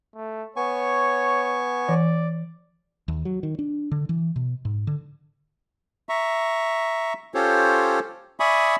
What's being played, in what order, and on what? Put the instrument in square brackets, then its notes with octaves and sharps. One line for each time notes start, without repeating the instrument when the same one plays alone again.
[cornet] A3
[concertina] B3 G#5 C#6 [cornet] C#5
[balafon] E3 [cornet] D5
[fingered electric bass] D#2
F#3
D#3
D4
D3
E3
B2
G#2
D3
[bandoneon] E5 A#5 C#6
C#4 F4 G4 A4 C5 C#5
D5 E5 G#5 B5 C#6 D#6